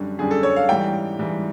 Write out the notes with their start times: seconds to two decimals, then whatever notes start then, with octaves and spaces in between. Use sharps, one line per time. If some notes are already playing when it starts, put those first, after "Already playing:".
Already playing: F#2 D3 G3
0.18 F#2 D3 G3 G#4
0.31 A4
0.43 C#5
0.56 F5
0.69 G#2 E3 G3 G5
1.19 G#2 E3 G3